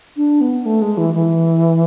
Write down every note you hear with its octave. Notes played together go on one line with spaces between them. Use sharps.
D4
B3
A3
G#3
E3
E3